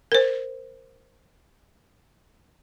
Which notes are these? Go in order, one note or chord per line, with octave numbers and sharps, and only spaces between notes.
A#4 C5